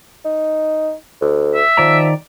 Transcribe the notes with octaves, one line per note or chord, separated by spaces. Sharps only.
D#4
D2
E5
D#3 F3 D5 A#5